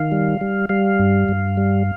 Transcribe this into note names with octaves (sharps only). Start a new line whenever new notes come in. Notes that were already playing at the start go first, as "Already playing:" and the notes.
Already playing: D#3 F5
G3
G3
G3 F5
G2
G2
G3